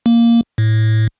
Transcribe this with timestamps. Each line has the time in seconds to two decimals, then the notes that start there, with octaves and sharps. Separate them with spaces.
0.06 A#3
0.58 A2